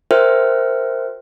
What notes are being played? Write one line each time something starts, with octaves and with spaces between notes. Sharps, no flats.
F#4 A#4 C5 E5 G5 F6